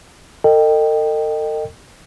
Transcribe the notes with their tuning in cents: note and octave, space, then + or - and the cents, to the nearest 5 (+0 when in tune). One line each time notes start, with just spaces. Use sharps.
A4 +45 D#5 -20 G5 +0